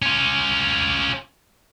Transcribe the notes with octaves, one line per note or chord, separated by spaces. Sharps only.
C#4 F4